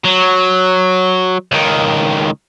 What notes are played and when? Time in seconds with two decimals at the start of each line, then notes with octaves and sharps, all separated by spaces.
0.05 F#3
1.52 C#2 D#3